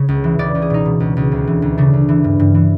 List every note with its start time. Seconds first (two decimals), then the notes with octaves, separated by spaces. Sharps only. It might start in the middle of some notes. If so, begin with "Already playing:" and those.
Already playing: C#3 C#5
0.08 C#2
0.24 E3
0.39 C#2 D5
0.55 C#2
0.62 G#4
0.70 B2 D#4
0.85 B2
1.00 C#2
1.17 C#2
1.32 D2
1.47 E3
1.62 D2
1.78 C#3 D4
1.93 D2
2.09 E3
2.24 G2
2.40 G2
2.55 E3